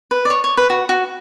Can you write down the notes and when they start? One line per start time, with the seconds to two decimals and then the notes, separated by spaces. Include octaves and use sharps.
0.11 B4
0.25 D5
0.30 C#5
0.44 C#5
0.57 B4
0.70 F#4
0.89 F#4